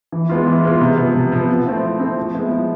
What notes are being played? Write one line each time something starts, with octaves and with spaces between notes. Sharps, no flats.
E3
G#3 B3 F4
E3
G#3 B3 F4
C3
F3 B3
C3
F3 B3
F3
A3 C4 E4
F3
A3 C4 E4
F3
G#3 B3 E4
F3